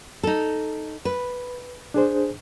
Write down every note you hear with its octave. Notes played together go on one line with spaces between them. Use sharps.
D#4 A4
B4
D4 G#4 C5